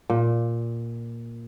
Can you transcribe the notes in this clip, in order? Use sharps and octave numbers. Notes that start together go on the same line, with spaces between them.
A#2